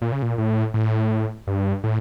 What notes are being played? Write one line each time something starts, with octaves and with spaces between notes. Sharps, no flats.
A#2
C#3
A#2
A2
A2
G2
A2